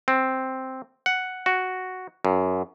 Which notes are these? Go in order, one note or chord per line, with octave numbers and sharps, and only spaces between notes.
C4
F#5
F#4
F#2